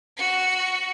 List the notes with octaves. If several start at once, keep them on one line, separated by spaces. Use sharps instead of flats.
F#4 C#7